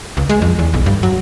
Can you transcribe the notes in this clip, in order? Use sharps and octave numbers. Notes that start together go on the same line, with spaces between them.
C#2
G#3
F2
E2
B1
G2
F#3